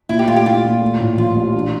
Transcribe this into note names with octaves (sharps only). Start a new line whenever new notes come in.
A#2 E4
G4
A3 F4
G4
E4 F4
A#2
A3
A2
F3 F4
A1
D4